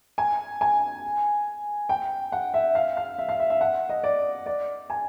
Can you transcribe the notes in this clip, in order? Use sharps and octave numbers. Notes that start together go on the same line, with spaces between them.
G#5
G#5
G5
F#5
E5
F5
F5
E5
F5
E5
E5
F#5
D#5
D5
D5
G#5